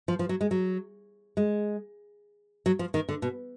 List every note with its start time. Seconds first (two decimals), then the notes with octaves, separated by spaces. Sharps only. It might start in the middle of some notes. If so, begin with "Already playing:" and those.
0.08 F3
0.19 F3
0.29 F#3
0.41 G#3
0.51 F#3
1.37 G#3
2.66 F#3
2.79 F3
2.94 D#3
3.09 D3
3.22 B2